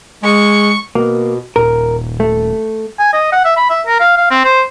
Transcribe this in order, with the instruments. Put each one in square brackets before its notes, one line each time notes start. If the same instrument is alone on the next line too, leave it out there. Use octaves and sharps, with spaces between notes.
[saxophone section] G#3 [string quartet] C#6
[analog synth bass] B2 [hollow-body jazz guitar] A#3
[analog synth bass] D#1 [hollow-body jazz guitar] A#4
[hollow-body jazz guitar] A3
[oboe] G#5
D#5
F#5
E5
B5
E5
A#4
F5
F5
C4
C5